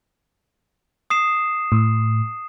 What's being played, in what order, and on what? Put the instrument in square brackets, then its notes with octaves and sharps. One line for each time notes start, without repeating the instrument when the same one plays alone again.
[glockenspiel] D#6 C7 E7
[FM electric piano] A2